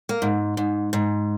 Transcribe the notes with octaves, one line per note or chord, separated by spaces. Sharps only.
A#3
G#2
G#2
G#2